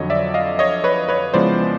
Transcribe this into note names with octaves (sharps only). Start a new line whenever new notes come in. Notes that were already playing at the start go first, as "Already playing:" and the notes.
Already playing: F2 D3 F#3 C#5 D#5
D5 E5
D#5 F5
C#5 D#5
B4 C#5
B4 C#5
C#3 F3 G#3 B3 E4 C5 D5